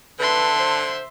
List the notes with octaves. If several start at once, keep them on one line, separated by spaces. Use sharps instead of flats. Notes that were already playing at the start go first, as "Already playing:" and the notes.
D3 B4 E5 A5 C6
C5